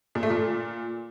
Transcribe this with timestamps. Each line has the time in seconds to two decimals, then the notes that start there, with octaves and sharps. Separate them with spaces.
0.15 A#2
0.23 A3
0.30 A#2